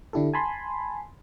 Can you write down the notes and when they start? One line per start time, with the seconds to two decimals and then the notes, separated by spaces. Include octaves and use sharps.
0.13 D3 D4 E4 G4 A4
0.34 G#5 A5 B5 C6